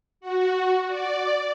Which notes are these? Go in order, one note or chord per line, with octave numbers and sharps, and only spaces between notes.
F#4
D5